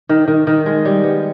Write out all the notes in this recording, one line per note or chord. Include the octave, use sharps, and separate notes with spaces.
D#3
D#3
D#3
G#3
G3
B3